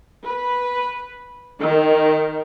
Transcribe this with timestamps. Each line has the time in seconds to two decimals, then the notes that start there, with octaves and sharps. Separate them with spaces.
0.22 B4
1.62 D#3